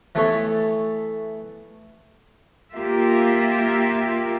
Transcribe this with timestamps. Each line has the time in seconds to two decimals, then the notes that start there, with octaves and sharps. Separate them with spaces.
0.15 E3 A3 B3 A4 C#5
2.73 A#3 F4 G4 E5